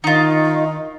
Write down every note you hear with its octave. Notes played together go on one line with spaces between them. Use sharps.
D#3 D#4 F4